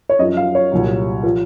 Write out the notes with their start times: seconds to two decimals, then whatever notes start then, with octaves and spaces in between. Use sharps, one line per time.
0.09 C#5
0.19 F#2 F3 D#5
0.37 F5
0.55 C#5
0.72 C2 A#2 F#3
1.23 F3